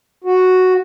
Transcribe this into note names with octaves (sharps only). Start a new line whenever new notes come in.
F#4